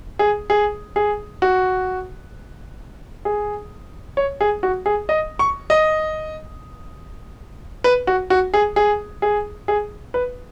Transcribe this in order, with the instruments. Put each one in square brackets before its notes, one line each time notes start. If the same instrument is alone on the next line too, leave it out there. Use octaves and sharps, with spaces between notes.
[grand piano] G#4
G#4
G#4
F#4
G#4
C#5
G#4
F#4
G#4
D#5
C#6
D#5
B4
F#4
F#4
G#4
G#4
G#4
G#4
B4